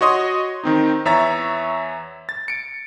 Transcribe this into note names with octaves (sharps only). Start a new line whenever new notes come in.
F#4 C#5 D#5 C6 D#6
D#3 C4 D#4
E2 C#5 E5 A#5 A6
A6
C#7 D7